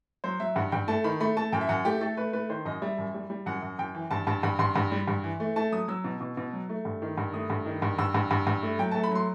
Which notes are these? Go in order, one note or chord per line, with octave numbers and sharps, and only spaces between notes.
F#3 C5
F#3 E5
G2 F#5
G2 G5
A3 A5
D#3 B5
A3 B5
A3 A5
F#2 G5
E5
F#2 F#5
A3 G4
A3 A4
A3 B4
A3 B4
D#3 C5
F#2 D#5
G3 E5
F#2
G3
G3
F#2 F#5
F#2
F#2 G5
E3
G2 A5
G2 A5
G2 B5
G2 C6
G2
G3
G2
E3
A3
A3 A5
F#3 D#6
F#3 E6
B2
B2
B2
F#3
A3
G2
D#3
G2
A3 D#6
G2
D#3
G2
G2 E6
G2
G2
G2
A3
F#3 G5
A3 A5
B5
F#3 C6